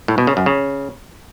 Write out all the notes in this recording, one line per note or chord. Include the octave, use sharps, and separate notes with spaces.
A2
B2
C#3
F#2
C#3